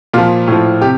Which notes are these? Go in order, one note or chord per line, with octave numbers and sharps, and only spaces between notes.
A#2 F3 F4
A2 F3
C3 G4